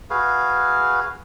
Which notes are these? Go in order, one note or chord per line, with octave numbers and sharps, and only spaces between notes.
F#4 G#4 B4 F5